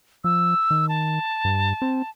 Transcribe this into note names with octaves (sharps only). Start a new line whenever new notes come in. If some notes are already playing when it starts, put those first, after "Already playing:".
F3 E6
D#3
A5
G2
C4